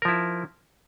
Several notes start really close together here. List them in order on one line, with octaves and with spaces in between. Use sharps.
A#4 F3 E4